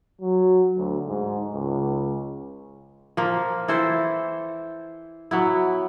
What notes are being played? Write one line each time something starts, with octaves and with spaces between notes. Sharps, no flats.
F#3
D2
G#2
C#2
F3 A#3
E3 E4 A4 C5
F#3 B3 E4